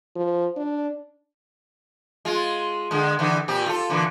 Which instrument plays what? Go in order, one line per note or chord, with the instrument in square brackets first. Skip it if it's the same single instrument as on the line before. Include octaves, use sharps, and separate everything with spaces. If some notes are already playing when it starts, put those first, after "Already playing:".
[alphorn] F3
D4
[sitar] G#3 F4
D3 G#3
D3 E3
A#2 C4 G4
F4 A4
A#2 D3 E3